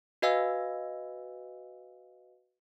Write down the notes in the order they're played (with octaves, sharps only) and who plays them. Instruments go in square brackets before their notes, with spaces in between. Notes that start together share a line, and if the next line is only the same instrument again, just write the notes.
[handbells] F#4 B4 D#5 F5 G#5 E6